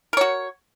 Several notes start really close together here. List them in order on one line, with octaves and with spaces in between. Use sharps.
A#4 C#5 F#4